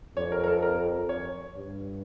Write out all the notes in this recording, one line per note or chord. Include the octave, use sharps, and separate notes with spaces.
F2 C#5
A#4
A#4
A4
A#4
C#5
G2